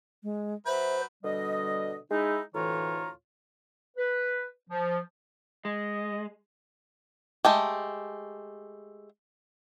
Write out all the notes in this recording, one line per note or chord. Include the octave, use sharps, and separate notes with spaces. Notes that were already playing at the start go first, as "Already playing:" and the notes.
G#3
F#3 B4 C5 E5
B2 D3 G3 D#5
G#3 D#4 E4
D2 A2 E3 F4 C#5 A#5
B4
F3
G#3 D#5
G#3 A3 G4